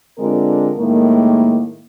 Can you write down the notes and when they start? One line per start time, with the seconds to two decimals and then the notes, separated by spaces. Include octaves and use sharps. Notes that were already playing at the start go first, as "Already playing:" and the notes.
0.19 D3 G#3 C4 D4 F4 A#4
0.77 A2 D#3 G#3 A#3